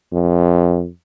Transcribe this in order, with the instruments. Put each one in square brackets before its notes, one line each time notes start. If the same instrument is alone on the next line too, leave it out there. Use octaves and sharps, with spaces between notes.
[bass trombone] F2